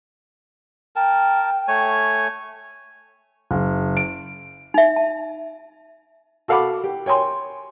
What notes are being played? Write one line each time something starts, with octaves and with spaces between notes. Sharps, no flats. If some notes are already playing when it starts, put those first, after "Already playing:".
A#4 G5 A5
A3 C#5 G#5
F#1
D7
D#4 E5
A5
F#4 A4 F5 F#5 B5 D6
G4
C#5 G5 G#5 C6